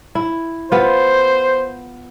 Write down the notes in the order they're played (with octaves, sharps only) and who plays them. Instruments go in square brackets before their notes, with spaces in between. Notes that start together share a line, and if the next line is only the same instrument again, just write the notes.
[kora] E4
[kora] B3 F4 [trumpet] C5